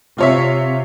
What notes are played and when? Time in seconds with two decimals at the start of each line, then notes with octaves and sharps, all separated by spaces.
0.18 C3 F4 C#5 E5